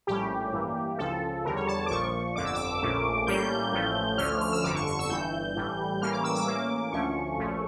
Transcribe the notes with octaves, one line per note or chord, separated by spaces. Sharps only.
A#1 A2 G3 C#4 G4
G2 E3 A#3
C#2 C#3 F3 A4
E2 D3 G3 A#4
C#5
A5
D6
A#1 A#2 F3 C#6
G1 F2 D3 D6
E6
D6
A#1 A#2 A3 C#4
A2 G3 A#3 C#4 G6
A1 A2 F3 A3 C#4
D2 D3 F3 A3 C#4 F6
F6
F6
E6
G1 F2 D3 D6
C#6
C#6
E6
G1 G2 E3 G6
A1 A2 E3 G3
A2 E3 G3 A#3 C#4 F6
D6
E6
D6
A2 E3 A#3 C#4
D2 D3 F3 A3 C#4 C#6
A#1 A#2 F3 A3 C#4